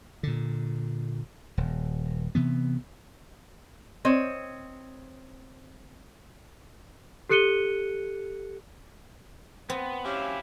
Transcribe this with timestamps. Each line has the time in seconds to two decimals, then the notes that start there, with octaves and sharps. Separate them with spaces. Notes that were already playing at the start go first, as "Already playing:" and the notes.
0.23 A#2 D3
1.57 D#1
2.35 C3 E3 B3
4.05 C4 C#5 D#5
7.29 G4 A4 F#6 C#7 D#7 G7
9.70 B3 C4
10.05 F#3 C#4 E4 G4 F5